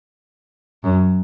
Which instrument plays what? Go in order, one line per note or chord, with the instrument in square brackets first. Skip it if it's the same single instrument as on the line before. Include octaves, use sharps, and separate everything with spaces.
[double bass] F#2